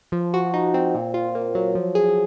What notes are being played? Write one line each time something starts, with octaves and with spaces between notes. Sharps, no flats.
F3
F#4
D#4
C4
A#2
F4
A#3
F#3
F3
G#4